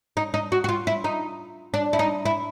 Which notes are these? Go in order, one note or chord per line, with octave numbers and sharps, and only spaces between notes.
D#4
D#4
F#4
F#4
F4
E4
D#4
D4
E4
D#4
E4